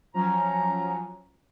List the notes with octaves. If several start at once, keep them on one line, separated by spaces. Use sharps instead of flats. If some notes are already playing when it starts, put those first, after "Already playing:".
F3 F#3 C#4 A#5